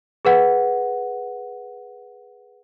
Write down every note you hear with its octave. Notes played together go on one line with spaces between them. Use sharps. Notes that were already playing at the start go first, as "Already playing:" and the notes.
G#4 B4 F#5